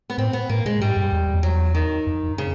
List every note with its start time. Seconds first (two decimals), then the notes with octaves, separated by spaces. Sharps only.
0.10 B3
0.18 A2 C4
0.33 B3
0.49 A2 A#3
0.65 A#2 G#3
0.81 G#2 G3
0.97 F#2
1.12 E2
1.27 E2
1.43 F#3
1.75 D#3
2.07 F2
2.38 C#3